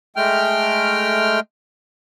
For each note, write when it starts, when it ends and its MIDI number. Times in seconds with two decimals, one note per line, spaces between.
0.16 1.40 56
0.16 1.40 57
0.16 1.40 79
0.16 1.40 89